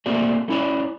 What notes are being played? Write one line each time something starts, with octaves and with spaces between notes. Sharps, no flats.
A3 A#3 C4 F#4 D5
A3 C#4 E4 C#5 D5